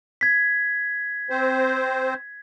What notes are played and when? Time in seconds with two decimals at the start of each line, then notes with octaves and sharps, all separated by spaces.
0.21 G#6 B6
1.30 C4 C5